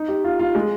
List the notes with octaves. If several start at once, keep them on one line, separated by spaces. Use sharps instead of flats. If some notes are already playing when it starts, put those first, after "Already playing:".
Already playing: D#4
G4
F4
F4
G#3